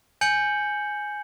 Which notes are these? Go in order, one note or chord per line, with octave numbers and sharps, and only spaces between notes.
G#5 G6 C#7 F#7